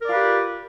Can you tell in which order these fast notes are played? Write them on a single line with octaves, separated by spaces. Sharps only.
A#4 D5 F4 B4 G4